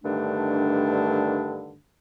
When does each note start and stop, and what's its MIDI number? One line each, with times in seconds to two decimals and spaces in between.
0.04 1.77 43
0.04 1.77 50
0.04 1.77 51
0.04 1.77 57
0.04 1.77 62